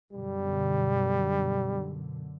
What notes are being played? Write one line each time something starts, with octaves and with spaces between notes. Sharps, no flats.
F#2 B2 D3 G3